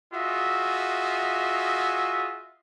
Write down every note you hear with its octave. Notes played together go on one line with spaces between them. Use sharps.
F4 F#4 G#4 D#5 E5